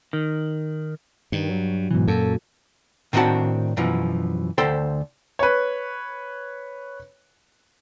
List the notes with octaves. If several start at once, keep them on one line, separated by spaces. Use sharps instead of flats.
D#3
G2 D#3
F#3
G#2 B2 E3
F#2 A#2 A4
A2 D#3 C4 D4 F#4 A5
F#2 B2 E3 F3
D2 A4 C5 G5 C6
B4 C#5